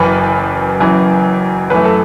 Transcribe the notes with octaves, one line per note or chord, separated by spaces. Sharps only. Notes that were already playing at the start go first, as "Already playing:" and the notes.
Already playing: F#1 F#2 E3 B4
F#1 F#2 E3
F#2 E3 A3 B4
A4